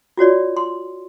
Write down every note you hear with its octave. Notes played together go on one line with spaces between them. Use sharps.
F4 F#4 C#5 D5
C6